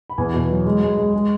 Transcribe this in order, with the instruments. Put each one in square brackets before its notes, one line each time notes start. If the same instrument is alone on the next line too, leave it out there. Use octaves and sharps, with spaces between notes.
[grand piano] B5
E2 G#5
B2
F#3
G#3
G#3
G#3
G#3